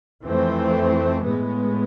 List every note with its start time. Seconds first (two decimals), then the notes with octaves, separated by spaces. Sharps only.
0.23 F2 E3 A3 C4
1.24 A2 G#3 B3